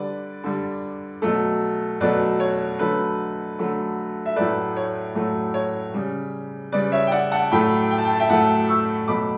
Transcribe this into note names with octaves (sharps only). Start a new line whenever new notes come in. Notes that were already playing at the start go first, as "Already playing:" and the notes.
Already playing: D3 G3 B4 D5
D3 G3
B2 F#3 A3
B2 F#3 A3 B4 D5
C#5
D3 F#3 A3 B4
D3 F#3 A3
E5
A2 F#3 A3 B4 D5
C#5
A2 F#3 A3
C#5
C#3 G3
C#3 G3 B4 D5
C#5 E5
G5
D5 F#5
F#5 A5
A2 F#3 A3 G5 B5
G5
A5
G5
A5
E5 G5
A2 F#3 A3 F#5 A5
C#6 E6
B2 F#3 A3 B5 D6